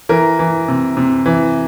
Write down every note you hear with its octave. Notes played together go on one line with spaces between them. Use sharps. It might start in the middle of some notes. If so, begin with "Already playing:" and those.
E3 A#4
E3
C3
C3
E3